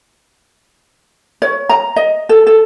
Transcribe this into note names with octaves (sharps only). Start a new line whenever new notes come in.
C#5
A#5
D#5
A4
A4